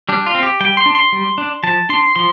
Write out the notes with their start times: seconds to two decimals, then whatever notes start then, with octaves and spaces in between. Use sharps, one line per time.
0.09 G3 D4
0.26 F4
0.35 C4
0.43 G4
0.61 G3 G5
0.77 C6
0.86 D4
0.95 C6
1.13 G3
1.38 D4
1.63 F3 A5
1.89 D4 C6
2.16 F3 C6